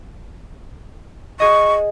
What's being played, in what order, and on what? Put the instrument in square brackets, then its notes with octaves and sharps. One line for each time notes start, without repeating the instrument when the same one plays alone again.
[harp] G#4 D#5 [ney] C#6